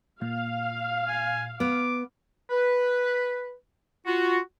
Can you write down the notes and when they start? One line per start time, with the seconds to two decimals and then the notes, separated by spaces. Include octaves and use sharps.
0.22 A#2 F5
1.08 G#5
1.60 B3 D6
2.50 B4
4.06 F4 F#4